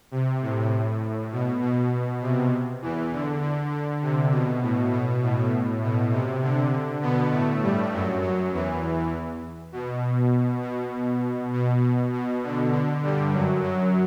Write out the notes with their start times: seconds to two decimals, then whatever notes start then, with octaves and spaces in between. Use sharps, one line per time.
0.11 C3
0.42 A2
1.32 B2
1.62 B2
2.22 C3
2.82 E2 E3
3.12 D3
3.42 D3
3.71 D3
4.02 C3
4.31 B2
4.62 A2
4.93 B2
5.22 A2
5.82 B2
6.12 C3
6.42 D3
7.02 B2 B3
7.32 A2 A3
7.62 G2 G3
7.92 F#2 F#3
8.22 F#2 F#3
8.53 E2 E3
9.72 B2
10.63 B2
11.53 B2
11.83 B2
12.13 B2
12.43 D3
12.73 D3
13.03 G2 G3
13.33 F#2 F#3
13.63 F#2 F#3